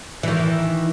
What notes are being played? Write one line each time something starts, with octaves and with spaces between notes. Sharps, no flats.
D#3 E3